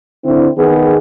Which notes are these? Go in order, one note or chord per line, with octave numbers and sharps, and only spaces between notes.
D3 C4 E4
D#3 B3 G#4